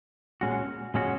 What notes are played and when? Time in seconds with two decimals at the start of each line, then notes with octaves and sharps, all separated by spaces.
0.41 A#2 G#3 C#4 F#4
0.94 A#2 G#3 C#4 F#4